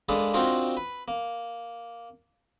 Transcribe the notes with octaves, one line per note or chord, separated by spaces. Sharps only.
G#3 A#3 D4 G#4 A4 B4
C4 D4 D#4 F4 F#4 A#4
B4
A#3